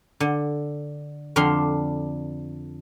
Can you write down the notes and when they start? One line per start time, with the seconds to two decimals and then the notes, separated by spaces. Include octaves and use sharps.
0.20 D3
1.36 F2 D3 D4 F5 C6